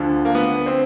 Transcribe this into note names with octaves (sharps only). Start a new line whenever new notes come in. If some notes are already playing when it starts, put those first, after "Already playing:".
Already playing: D2 D3 F3
A#3
B3
C4